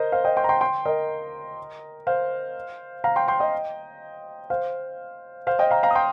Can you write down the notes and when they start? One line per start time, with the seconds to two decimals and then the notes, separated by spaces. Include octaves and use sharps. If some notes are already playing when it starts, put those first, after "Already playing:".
Already playing: A#4 C5 D#5
0.12 C5 F5
0.24 D#5 G5
0.37 G5 C6
0.44 A#5
0.49 G5 C6
0.61 G5 C6
0.85 A#4 D#5
2.07 C5 F5
3.04 F5 A#5
3.16 G5 C6
3.28 G5 C6
3.40 D#5 G5
4.50 C5 F5
5.47 C5 F5
5.59 D#5 G5
5.71 F5 A#5
5.83 F5 A#5
5.91 D#6
5.95 G5 C6